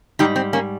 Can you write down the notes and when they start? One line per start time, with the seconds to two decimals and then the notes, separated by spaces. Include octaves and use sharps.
0.19 G#2 G3 D#4 G4
0.36 C4
0.53 A#3 C#4